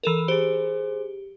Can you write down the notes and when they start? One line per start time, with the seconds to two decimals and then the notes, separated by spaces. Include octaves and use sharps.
0.03 E3 A4 A#4
0.28 G4 G#4 C5